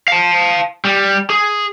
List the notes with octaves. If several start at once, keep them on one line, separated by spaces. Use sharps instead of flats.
F5 A5
G3
G#4